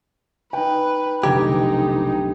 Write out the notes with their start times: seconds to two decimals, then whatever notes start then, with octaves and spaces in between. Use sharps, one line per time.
0.53 D#4 B4 G5
1.24 F1 B1 D3 D#4 G4 A#5 G#6